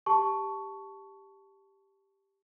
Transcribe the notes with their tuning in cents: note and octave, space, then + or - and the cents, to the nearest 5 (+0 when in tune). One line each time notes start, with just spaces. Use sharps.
G4 +0 A5 +0 C#6 +10